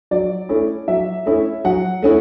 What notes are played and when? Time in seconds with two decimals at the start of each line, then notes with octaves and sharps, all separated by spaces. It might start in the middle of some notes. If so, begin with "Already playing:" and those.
0.11 F#3 D5
0.49 A3 C#4 E4
0.88 F#3 E5
1.26 A3 C#4 E4
1.65 F#3 F#5
2.02 A3 C#4 E4